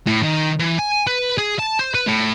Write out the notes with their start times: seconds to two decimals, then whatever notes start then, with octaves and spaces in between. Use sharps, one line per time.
0.07 A2
0.23 D#3
0.59 E3
0.79 G#5
1.07 B4
1.38 G#4
1.59 A5
1.79 C5
1.94 B4
2.07 A2